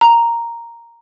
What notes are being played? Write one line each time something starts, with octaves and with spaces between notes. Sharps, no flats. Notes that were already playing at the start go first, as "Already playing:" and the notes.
A#5